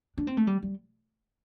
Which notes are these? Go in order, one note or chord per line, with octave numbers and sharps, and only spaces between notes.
D4
C4
A3
G3
G3